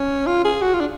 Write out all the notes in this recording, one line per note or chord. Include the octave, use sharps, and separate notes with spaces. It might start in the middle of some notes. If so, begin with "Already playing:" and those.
Already playing: C#4
F4
G#4
F#4
F4
D4